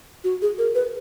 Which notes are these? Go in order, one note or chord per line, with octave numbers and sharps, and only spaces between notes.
F#4
G#4
A#4
B4